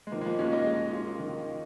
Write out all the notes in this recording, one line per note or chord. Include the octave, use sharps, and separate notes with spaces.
G#3
D#3 F3 A#3
G#3
F3 A#3
D#2 G#3 C#4
A#3 D#4
G#3
F4
D#3